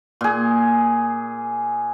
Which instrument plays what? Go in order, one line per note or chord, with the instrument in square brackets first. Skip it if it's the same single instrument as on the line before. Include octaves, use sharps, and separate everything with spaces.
[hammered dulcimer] A#2 G#4